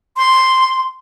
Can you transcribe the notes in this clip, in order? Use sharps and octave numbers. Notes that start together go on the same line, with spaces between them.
C6